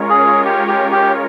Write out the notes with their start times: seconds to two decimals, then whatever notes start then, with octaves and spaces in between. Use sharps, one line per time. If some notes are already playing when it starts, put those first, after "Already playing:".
Already playing: G#3 C#4 F4 A#4 C#5
0.09 G#4
0.45 G4
0.68 G4
0.92 G4